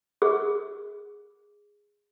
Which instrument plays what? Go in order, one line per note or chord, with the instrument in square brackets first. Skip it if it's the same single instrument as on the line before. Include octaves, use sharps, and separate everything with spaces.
[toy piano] G#4